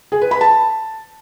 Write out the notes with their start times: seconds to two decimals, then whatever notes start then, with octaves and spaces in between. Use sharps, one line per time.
0.12 G#4
0.22 B4
0.31 B5
0.41 A5